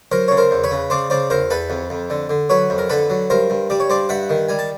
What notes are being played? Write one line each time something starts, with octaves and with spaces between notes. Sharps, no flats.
F#3 A#4 C5
C#3 C#5
A#4 C5
E2
B4 C#5
C#3
C#3 C5 D5
C#3 C5 D5
E2 A#4 C5
E2 A4 B4
F2
F2
D3
D3
F#3 B4 C#5
F2
A#4
D3 A4 B4
F#3
G2 A#4 C5
G2
G3 D5
C#5
G2 C5 D5
G2 E5 F#5
D#3
G3 G#5
A5